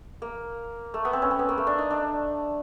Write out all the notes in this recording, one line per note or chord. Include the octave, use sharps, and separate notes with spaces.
A#3
A3
B3
C4
C#4
C4
B3
A#3
A3
D4
D#4
D4